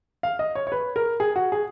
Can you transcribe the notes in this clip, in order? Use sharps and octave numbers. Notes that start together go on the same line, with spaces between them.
F5
D#5
C#5
C#5
B4
A#4
G#4
F#4
G#4